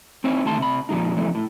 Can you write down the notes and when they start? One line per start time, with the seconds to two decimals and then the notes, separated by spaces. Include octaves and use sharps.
0.24 C4 D#4 E4 C5 C#5
0.45 D2 D#3 A3 A5 C6
0.58 C3 B5
0.89 A#2 F3 G#3 D#4
1.16 C3 E3 F3 G#3 A3
1.35 A2